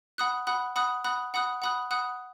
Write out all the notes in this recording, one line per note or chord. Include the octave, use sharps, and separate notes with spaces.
F#5 B5 D#6 F#6
F#5 B5 D#6 F#6
F#5 B5 D#6 F#6
F#5 B5 D#6 F#6
F#5 B5 D#6 F#6
F#5 B5 D#6 F#6
F#5 B5 D#6 F#6